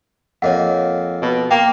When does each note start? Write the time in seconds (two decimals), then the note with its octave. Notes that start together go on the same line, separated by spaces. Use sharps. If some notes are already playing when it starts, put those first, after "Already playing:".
0.42 F2 A#3 C#5 D#5 F#5 G#5
1.22 B2
1.51 A#3 F5 G5 A5 C6